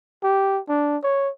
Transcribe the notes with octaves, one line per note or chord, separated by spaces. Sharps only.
G4
D4
C#5